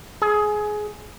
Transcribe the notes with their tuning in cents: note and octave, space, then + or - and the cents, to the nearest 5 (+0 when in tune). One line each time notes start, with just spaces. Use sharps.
G#4 +20